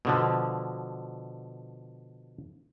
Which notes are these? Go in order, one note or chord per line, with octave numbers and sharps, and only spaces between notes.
B2 D3 F3